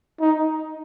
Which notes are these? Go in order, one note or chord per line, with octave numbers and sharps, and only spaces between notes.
D#4